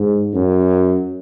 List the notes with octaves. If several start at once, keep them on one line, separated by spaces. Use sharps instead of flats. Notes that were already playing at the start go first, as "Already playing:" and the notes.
Already playing: G#2
F#2